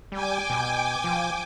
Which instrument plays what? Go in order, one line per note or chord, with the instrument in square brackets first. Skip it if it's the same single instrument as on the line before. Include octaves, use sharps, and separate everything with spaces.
[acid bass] G3 [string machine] G5 G#5 D6
[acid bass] B2
F3